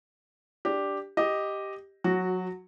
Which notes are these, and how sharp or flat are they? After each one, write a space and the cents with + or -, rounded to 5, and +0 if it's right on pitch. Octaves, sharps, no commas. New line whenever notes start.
D4 +0 G4 +0
G4 +0 D#5 +0
F#3 -20 F#4 +0